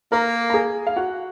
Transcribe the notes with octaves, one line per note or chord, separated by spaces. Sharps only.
A#3 A#4 A#5
A#5
G#4 G#5
F5
F#4 F#5